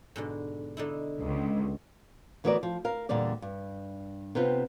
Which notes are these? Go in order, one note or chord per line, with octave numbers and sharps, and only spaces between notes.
G#2 B2 D3
D3 D#4 E4
C#2
D2 E3 B3 F#4 A#4 D5
F3
A#4 F5
E2 A#2 D3 G3 D5
G2
C3 B3 C4 F4